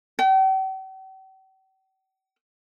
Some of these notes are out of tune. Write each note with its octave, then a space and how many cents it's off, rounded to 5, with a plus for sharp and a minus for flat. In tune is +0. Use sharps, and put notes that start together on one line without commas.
G5 -45